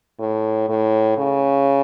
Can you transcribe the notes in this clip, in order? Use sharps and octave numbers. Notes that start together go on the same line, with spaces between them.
A2
A2
C#3